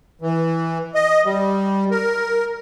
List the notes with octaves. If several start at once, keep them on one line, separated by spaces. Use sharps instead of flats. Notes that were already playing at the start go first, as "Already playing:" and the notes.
E3
D#5
G3
A#4